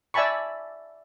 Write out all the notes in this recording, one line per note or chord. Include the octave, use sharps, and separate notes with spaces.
D5 E5 G#5 A5 B5 C#6